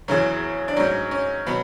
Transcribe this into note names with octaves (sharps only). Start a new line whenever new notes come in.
E2 C#3 F#3 C#4
D4
G#2 F#3 C#4
C#4
B2 F#3 B3